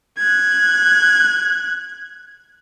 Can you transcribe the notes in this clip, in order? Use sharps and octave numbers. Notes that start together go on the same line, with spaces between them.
F#6 G#6